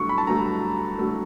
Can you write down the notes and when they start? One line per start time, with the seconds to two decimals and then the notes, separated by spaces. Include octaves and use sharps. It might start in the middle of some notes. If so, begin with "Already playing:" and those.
Already playing: G2 D3 F#3 A3 C#6
0.09 B5
0.18 A5
0.27 G2 D3 F#3 A3 A#5
0.99 D3 F#3 A3